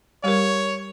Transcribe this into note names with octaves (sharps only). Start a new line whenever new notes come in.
G3 G4 A#4 C#5